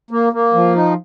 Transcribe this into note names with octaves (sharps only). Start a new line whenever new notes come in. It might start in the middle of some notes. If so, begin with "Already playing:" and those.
A#3
A#3
F3
D#4